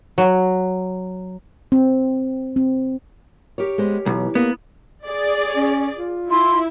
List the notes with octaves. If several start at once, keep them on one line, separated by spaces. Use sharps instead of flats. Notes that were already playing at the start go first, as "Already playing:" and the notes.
F#3
C4
C4
G4 A#4 C#5
G#3 B3 C5
B1 E3
A#3 B3
G#4 D5
C#4
F4
E4 C6